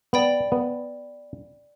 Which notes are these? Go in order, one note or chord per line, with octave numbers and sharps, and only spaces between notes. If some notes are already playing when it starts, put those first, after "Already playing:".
B3 D5 G5 B5
B3